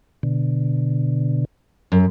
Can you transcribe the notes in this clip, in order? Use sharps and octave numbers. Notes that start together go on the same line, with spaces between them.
B2 D3
F#2